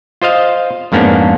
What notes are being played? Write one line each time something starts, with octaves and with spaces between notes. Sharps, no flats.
F4 C5 D#5 F5
F2 G#2 A#3 B3 C#4 D4